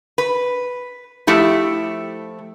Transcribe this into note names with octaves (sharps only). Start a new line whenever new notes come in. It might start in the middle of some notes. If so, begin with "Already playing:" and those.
B4
F3 A3 E4 G4